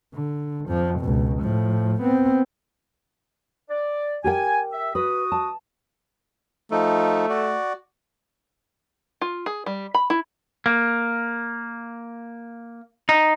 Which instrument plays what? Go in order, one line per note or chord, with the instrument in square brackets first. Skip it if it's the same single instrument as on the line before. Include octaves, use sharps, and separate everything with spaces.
[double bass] D3
F2 F3
C#2 B2
A2 F3
B3 C4
[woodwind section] D5
[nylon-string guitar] G4 A#4 G5 [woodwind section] G#5
[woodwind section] E5
[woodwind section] F#4 D#6 [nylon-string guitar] B4
[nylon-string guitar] A5
[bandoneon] F3 D#4 [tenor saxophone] A3
[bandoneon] F#4 D5
[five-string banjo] F4
G#4
G3
B5
E4
[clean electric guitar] A#3
D#4